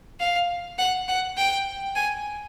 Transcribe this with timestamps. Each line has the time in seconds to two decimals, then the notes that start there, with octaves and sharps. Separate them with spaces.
0.20 F5
0.78 F#5
1.08 F#5
1.37 G5
1.95 G#5